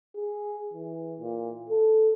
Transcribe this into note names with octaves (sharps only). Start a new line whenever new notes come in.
G#4
E3
A#2
A4